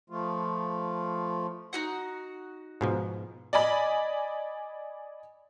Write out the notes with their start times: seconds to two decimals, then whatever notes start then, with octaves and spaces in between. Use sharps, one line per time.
0.10 F3 A3 F4
1.73 D#4 F#4 F#5
2.81 G#2 B2 F3
3.53 D5 D#5 G#5 B5